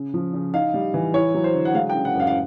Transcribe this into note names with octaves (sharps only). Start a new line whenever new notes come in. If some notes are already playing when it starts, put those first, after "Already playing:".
Already playing: C#3
F3
C#3
D#4 F5
G3
E3
E4 C#5
F#3
C5
D3
F#5
G#3 F5
G5
C#3
F#5
F#2 F5
F5